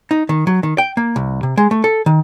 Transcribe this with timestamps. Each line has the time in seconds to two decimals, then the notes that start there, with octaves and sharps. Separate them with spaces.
0.11 D#4
0.29 D#3
0.47 F#3
0.63 D#3
0.78 G5
0.97 A#3
1.16 C2
1.43 C3
1.57 G#3
1.71 A3
1.84 A4
2.06 D#3